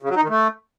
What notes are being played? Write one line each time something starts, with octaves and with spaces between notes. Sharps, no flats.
C#3
F#3
D#4
D#3
A3